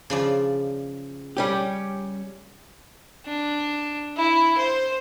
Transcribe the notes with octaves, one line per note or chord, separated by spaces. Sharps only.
C#3 F3 D5
G3 C#4 G4
D4
E4
C5